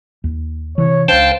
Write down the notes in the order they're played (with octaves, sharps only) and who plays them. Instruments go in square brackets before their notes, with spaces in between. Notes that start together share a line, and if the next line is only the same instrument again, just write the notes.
[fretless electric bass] D#2
[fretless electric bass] C3 E3 [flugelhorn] C#5
[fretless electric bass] C#2 D4 [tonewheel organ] C5 G5 A5 [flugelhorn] F5